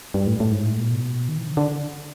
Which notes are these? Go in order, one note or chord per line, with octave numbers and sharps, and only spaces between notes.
G2
A2
A2
G#2
A2
A#2
B2
D#3
E3
D3
D3